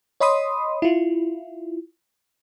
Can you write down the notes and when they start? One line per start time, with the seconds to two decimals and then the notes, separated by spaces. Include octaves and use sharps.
0.20 C#5 D#5 B5 C6 D#6
0.82 E4 F4